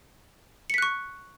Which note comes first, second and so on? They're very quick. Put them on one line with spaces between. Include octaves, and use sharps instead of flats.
C#7 B6 F#6 C#6